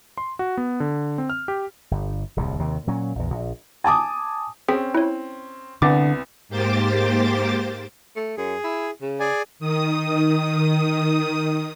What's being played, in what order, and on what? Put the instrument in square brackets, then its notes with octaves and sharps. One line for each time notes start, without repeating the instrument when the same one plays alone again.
[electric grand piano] C6
F#4
B3
D3
C4
F6
G4
[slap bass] G1
D1 C2 F2 C3
D#2 C3 D#3
A#2 F#3 C#4
A#1 E2
A#1
[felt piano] G#5 A5 D6 D#6
[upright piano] C4 C#4 [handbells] G#4 G5 B6
[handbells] E4 C#5
[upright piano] C2 B3 A6 [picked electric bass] D3 [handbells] D6
[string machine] G#2 A#3 G4 C5 D6 A6
[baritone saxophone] A3
[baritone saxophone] F#2 [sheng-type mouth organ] G#4
[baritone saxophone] E4
C#3
[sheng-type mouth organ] G#4 D5 G#5
[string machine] D#3 D#6